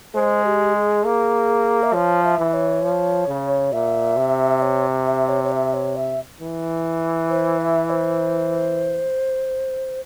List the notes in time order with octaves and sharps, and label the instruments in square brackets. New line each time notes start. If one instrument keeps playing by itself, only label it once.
[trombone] G#3 [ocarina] C5
[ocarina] G4
G#4
[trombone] A#3
[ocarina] E5
[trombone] F3 [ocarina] C#5
[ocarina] E5
[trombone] E3
[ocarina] C#5
[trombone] F3
C#3
[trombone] A#2 [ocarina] E5
[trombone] C3
[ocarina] C#5
E5
C#5
C#5
E5
C#5
E5
[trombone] E3
[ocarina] C5
E5
C5